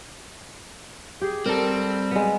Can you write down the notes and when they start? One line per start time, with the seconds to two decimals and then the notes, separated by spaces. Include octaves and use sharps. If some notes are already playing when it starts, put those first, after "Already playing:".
1.21 G4 G#4
1.46 G3 C4 A4 A#4
2.11 G#3 B3